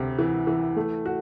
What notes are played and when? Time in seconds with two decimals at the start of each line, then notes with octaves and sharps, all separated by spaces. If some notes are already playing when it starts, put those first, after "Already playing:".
Already playing: D2 C3
0.19 E3
0.47 E3
0.76 A3
1.06 F#4